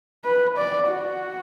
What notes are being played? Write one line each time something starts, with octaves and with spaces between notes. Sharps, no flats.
B4
D5
F#4